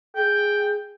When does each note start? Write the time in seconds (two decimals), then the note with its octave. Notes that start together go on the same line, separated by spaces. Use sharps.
0.16 G#4 G5